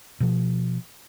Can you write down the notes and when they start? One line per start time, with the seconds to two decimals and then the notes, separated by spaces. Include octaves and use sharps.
0.20 B2 F3